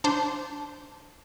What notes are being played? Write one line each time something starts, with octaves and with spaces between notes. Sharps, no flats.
D4 C5